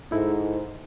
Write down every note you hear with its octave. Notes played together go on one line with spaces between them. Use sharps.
G#2 D#4 E4 A4